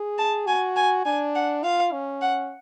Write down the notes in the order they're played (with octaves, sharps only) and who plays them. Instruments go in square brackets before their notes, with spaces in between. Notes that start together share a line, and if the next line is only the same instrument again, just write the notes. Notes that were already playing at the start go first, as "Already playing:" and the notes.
Already playing: [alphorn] G#4
[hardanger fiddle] A5
[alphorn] F#4 [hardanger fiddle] G#5
[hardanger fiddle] G#5
[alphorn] D4 [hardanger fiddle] G#5
[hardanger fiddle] F#5
[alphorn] F4 [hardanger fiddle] F5
[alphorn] C#4
[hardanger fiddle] F#5